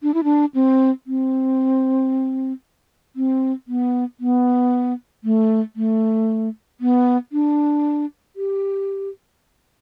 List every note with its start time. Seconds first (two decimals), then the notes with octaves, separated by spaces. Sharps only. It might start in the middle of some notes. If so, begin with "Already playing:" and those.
0.03 D4
0.14 E4
0.24 D4
0.54 C4
1.07 C4
3.16 C4
3.68 B3
4.20 B3
5.24 A3
5.76 A3
6.81 B3
7.32 D4
8.36 G4